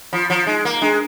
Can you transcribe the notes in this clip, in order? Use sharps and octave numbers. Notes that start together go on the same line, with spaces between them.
F3 F4
F3
G#3 D#4
A#3
G#3 D4